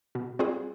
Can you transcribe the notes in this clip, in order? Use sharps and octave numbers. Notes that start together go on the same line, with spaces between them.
B2
G3 C4 F4 G#4